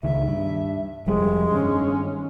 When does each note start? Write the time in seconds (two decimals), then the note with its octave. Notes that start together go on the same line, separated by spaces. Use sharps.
0.03 C#2 D#3 E5
0.27 G2
1.06 F1 F2 G3 G#3
1.51 G2 D#3 C#4